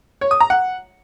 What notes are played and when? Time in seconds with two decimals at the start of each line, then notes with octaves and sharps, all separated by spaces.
0.21 C#5
0.31 D#6
0.40 A#5
0.50 F#5